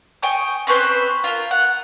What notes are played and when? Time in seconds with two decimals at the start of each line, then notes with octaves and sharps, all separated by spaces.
0.23 G5 G#5 C#6 D#6
0.67 C4 C#4 B4 C5
1.24 F4 A#4
1.51 F#5